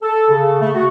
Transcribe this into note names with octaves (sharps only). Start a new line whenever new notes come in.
A4
C#3
A3
F#4